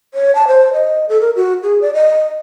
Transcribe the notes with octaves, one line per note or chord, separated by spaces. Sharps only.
C#5
A5
C5
D#5
A4
A#4
F#4
G#4
D5
D#5